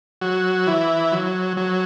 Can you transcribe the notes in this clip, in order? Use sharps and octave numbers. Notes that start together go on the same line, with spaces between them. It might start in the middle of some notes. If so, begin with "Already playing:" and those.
F#3 F#4
E3 E4
F#3
F#3